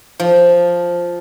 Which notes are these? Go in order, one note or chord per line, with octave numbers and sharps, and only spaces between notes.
F3